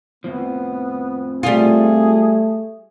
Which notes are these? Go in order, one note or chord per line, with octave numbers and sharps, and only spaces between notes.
F2 A2 F3 B3
G3 A3 F4 G#4